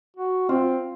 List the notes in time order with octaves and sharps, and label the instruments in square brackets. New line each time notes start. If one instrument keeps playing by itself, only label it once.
[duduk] F#4
[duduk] C4 [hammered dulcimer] F4